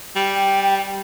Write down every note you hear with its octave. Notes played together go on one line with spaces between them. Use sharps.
G3 G5